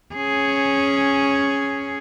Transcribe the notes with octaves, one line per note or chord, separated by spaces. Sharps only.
C#4 G#4